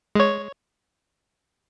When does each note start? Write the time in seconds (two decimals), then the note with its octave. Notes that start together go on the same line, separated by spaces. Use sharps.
0.15 G#3 C#5